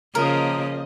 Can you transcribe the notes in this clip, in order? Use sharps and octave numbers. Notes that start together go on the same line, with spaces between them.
C#3 F3 A#3 A#4 D#5